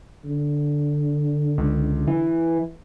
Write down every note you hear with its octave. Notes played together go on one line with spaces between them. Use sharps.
D3
C#2
E3